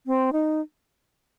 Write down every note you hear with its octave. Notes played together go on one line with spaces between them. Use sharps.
C4
D#4